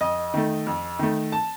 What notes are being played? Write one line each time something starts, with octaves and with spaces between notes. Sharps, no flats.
F2 D#5
D#3 A3
F2
D#3 A3
A5